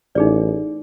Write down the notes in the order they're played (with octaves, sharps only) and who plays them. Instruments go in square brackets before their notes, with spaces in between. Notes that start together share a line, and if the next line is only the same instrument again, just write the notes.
[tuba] A1 [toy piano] D#4 G#4 D5